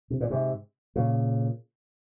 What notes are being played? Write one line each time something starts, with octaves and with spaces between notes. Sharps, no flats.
C3
A#2
G#2 C3
A#2 C#3